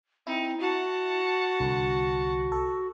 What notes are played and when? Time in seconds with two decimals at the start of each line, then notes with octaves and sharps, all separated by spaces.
0.27 C4 D#4 E4
0.60 F#4 F#5 A5
1.60 C2 D3
2.52 A4